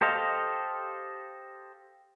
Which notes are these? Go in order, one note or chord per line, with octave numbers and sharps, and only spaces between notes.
G4 A4 C5 D#5 F5